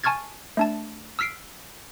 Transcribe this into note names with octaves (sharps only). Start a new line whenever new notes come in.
G#5 A5 C#6 F6 G#6 A6
A3 D4 A5
E6 F6 B6 C7 D7